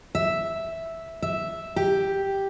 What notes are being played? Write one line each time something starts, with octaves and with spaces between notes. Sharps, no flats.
E5
E5
G4